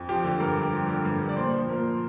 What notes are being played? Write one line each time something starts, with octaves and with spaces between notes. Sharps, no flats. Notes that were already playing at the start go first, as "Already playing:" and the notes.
Already playing: F2
F3 G4
D3
G2 A#4
G2
F3
D3
G2
G2
D5
A#2 C5
F3
A#2 A#4
F3